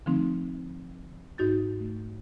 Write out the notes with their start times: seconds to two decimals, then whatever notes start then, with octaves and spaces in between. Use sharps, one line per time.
0.06 D3 F3 A3 C4 D#4
1.38 G#2 D#4 F#4 G6 A6
1.80 A3